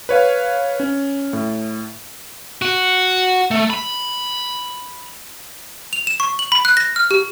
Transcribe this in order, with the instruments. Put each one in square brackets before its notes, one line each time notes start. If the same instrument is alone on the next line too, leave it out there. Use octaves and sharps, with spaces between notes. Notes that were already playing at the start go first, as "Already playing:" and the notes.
[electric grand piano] B4 C#5 F5
C#4
A2
[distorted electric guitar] F#4
A3
B5
[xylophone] F7
E7
C#6
F#7
B5
F#6
A#6
F6
G4